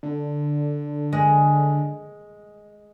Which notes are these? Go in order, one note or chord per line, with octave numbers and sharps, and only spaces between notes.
D3
G#3